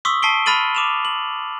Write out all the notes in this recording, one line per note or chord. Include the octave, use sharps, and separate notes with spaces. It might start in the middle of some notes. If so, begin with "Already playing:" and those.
C6 C#6 D#6 E6 B6
A5 B6 C7 D7 G7
B5 F6 A6 D#7 F#7
D6 E7 F7
F#7